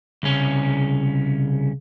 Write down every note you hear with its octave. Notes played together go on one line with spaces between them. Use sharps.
C2 C#3 C#4